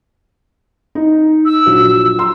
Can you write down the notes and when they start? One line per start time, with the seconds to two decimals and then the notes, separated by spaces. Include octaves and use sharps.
0.95 D#4
1.45 E6
1.66 A#1 F#3
2.18 A#5 C6 E6